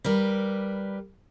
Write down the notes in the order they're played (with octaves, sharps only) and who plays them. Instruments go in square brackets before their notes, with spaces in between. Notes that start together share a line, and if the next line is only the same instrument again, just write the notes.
[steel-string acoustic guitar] G3 A#4 B4